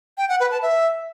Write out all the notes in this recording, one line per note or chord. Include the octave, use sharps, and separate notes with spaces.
G5
F#5
B4
A5
E5